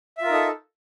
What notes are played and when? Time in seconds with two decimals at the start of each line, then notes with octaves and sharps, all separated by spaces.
0.17 E5
0.22 F4
0.26 A#4
0.30 D#4
0.34 A4